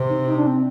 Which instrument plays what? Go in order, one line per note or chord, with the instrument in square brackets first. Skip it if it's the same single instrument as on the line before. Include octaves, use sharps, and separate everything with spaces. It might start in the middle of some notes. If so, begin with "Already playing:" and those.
Already playing: [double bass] C3
[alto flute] D#4
D#4
D4
C4